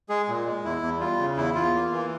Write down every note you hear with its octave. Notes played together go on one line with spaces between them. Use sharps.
G#3 G#4
A#2
G#3
E2 E4
E2
G3 F4
C#3
E2 E4
E2 F4
A#3
E3